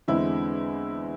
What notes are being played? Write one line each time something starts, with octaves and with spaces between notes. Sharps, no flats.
E2 D3 G#3 C4 E4